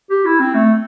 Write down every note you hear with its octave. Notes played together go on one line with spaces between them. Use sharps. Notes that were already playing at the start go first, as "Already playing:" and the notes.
G4
E4
C4
A3